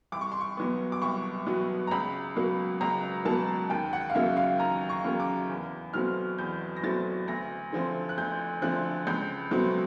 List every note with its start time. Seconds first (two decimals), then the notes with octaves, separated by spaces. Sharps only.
0.12 C2 D6
0.21 C#6
0.32 C6
0.41 C#6
0.57 B2 F#3 B3
0.92 D6
1.02 C2 C#6
1.47 B2 F#3 B3
1.87 A#5
1.91 C#2 B5
2.36 B2 F#3 A#3
2.81 C#2 A#5
3.25 B2 F#3 A#3 A5
3.70 D#2 G5
3.93 F#5
4.10 F5
4.14 C#3 F#3 A#3 E5
4.37 F5
4.59 D#2 A#5
4.89 C#6
5.04 C#3 F#3 A#3
5.20 D6
5.49 E2
5.94 B2 F#3 A3 C4 F6
6.38 E2 G6
6.77 A#6
6.83 B2 F#3 A3 C4 A6
7.27 D2 A#6
7.72 D3 F3 A3 C4
8.09 F#6
8.18 D2 G6
8.62 D3 F3 A3 C4 F#6
9.07 C#2 G6
9.51 B2 F#3 A3 C4